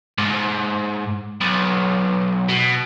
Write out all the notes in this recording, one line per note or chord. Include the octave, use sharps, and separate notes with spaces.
G#2
B1
B2